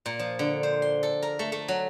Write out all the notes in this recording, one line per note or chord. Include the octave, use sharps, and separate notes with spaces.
A#2
F3
D3
C5
C6
A4
A#4
A3
A3
F#3